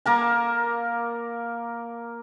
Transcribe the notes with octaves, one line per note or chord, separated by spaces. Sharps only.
A#3 A#4 A5